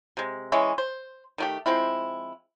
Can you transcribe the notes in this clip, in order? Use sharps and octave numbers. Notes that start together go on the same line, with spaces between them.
C3 G#3
E3 G#3 C#4 E5
C5
D#3 A3 G4
F3 G#3 C4 E4